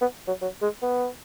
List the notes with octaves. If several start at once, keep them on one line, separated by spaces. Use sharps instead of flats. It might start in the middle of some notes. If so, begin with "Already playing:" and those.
B3
F#3
F#3
G#3
B3